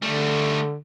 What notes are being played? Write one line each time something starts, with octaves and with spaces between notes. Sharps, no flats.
D3 G3 A3